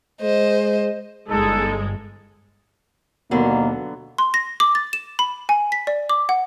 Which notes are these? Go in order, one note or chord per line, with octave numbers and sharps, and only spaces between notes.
G#3 C5 D#5
G1 G#3 D#4 A4
D#2 B2 D3 F#3 A#3 B3
C6
A#6
D6
A6
E7
B5
G#5
B6
D5
D6
F#5